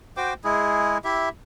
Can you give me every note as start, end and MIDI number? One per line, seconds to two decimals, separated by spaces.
0.17 0.33 66
0.17 0.33 72
0.17 0.33 79
0.17 0.33 86
0.44 0.98 56
0.44 0.98 64
0.44 0.98 68
1.04 1.29 64
1.04 1.29 67
1.04 1.29 76